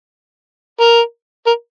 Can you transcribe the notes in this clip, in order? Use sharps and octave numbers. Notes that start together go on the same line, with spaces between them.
A#4
A#4